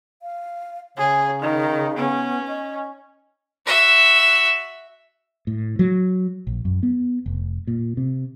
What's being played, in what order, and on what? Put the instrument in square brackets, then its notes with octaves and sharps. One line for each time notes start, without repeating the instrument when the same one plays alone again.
[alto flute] F5
[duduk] C#3 [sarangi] G#4 [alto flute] C#5
[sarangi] D#3 [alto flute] D#4
[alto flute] B3 [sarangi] C#4
[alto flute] D#5
[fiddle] F#4 E5
[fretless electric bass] A2
F#3
A#1
F#2
B3
F1
A#2
C3